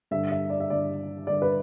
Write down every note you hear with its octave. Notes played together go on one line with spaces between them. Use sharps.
G2 D3 E5
E5
D5
E5
G2 D3 D5
G2 D3 D5
B4